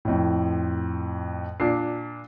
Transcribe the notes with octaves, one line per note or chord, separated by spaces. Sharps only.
F2 A2
A#2 D4 C7